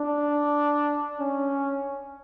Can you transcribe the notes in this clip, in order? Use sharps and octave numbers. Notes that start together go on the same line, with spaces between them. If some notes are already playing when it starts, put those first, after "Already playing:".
Already playing: D4
C#4